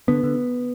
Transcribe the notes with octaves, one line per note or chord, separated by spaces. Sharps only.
D3 B3
D3